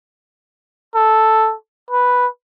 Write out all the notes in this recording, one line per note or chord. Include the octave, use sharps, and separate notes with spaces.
A4
B4